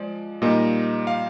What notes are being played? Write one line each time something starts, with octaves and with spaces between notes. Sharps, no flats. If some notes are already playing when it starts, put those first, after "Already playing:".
Already playing: F3 G#3 D5
A#2 G3 A#3 D#4 D#5
F5